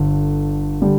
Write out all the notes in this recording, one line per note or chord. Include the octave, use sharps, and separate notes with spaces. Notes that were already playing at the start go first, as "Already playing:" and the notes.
Already playing: G1 G2 D3
D3 G3